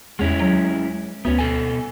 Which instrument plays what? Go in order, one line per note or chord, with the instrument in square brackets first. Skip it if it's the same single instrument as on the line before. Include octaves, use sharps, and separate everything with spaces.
[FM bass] E2 [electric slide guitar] G#3 C#4 E4
[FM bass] F#3
[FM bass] D2 [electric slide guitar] B3 C#4
[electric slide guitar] B2 A4 G#5